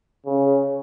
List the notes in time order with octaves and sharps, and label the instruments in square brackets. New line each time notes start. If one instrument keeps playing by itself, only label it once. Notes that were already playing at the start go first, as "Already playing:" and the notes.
[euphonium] C#3